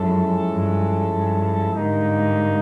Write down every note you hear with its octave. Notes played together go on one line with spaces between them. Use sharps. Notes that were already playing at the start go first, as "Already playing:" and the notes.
Already playing: F#2 F3 G#3 C#4 E4 A4
G2
G2
G#2 D3 G3 A#3 D#4